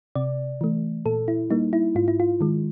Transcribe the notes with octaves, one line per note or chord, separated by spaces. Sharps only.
C3 D5
E3 A3
A#2 A4
E4
G3 A#3 D#4
E4
G#2 F4
E4
F4
D#3 G#3